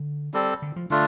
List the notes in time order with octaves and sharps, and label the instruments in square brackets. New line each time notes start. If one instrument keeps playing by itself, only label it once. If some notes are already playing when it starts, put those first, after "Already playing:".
Already playing: [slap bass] D3
[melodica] G3 C4 A4
[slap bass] D3
F3
[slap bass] D3 [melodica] A3 D4 F4